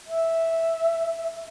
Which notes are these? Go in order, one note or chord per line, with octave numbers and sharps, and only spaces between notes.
E5